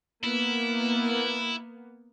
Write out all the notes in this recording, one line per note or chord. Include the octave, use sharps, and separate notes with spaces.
A#3 B3 E4